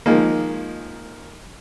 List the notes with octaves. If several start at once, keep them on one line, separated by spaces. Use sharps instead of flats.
D#3 F3 G#3 A#3